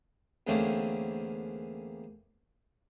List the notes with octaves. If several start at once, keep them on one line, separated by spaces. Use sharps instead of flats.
E2 D3 A3 A#3 C4 C#4